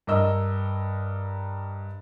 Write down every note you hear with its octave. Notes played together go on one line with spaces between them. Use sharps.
G2 A#4 D#5 E6